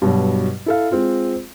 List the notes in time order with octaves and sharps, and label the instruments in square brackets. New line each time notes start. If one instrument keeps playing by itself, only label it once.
[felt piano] G2 B2 F#3
E4 A4 F5
G#3 C4 F4